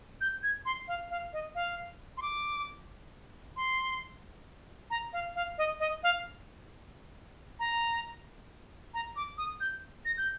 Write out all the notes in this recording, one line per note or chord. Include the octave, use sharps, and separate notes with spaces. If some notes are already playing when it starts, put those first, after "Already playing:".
G6
G#6
C6
F5
F5
D#5
F5
C6
D6
C6
A#5
F5
F5
D#5
D#5
F5
A#5
A#5
D6
D#6
G6
A#6
G6